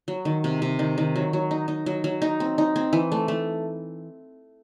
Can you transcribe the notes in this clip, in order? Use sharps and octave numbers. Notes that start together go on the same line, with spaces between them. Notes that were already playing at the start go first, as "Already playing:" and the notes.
F#3
D#3
C3
C3
D#3
D#3
F#3
F#3
D#4
D#4
F#3
F#3
D#4
C4
D#4
C4
E3
A3
A3